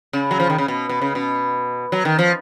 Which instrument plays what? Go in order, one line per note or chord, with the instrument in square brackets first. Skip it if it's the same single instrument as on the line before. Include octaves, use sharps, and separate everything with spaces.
[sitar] C#3
F#3
F3
D#3
C#3
B2
B2
C#3
B2
F#3
D#3
F3